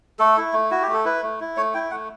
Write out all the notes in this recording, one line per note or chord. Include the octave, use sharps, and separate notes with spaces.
A3 A4
E4
A3
E4 F#4
G4
A3
A4
E4 B4
A3
E4
A3 C#5
E4 G5
A3 F#5